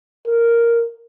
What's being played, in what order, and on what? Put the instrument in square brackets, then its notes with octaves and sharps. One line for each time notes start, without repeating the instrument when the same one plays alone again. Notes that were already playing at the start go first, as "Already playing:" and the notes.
[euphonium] A#4